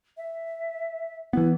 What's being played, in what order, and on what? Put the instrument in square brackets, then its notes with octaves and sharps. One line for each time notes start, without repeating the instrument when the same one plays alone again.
[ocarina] E5
[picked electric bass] E3 B3 [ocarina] E4